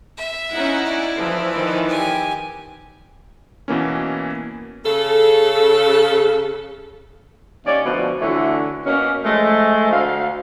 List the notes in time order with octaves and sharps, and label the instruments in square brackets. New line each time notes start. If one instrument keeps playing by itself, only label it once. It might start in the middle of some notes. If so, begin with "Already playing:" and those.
[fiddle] E5
[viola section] C#4 D#4 F#5 [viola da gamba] E4
[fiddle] D5
[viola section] E3 F3
[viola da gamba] D#3
[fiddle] G4 G#5
[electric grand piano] B2 E3 A#3 C#4
[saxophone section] C#3 A4
D#2 C#4 D5
D2 B2 F3
D2 D3 E3 C#5
B2 A#3 C#4
F3 G#3 A3
D2 F5